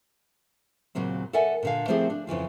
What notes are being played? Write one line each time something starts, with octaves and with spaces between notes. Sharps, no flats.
D#2 A#2 C#3 F#3 C4
A4 A#4 D5 E5 F#5 G#5
A#2 D3 F5
F3 A3 C4 E4 G4 G#4
D4
F2 C#3 E3 F4